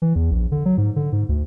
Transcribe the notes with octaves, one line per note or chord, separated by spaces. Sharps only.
E3
E2
A#1
D3
F#3
G#2
D3
G#2
D2